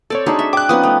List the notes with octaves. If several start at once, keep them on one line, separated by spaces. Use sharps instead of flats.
C4 A4 C#5 D5
G#3 D4 D#4 F#4 G#4 B5
E5
G5 D6 F#6
F3 B3 C#4 D#4 F4 D#6
A3 G5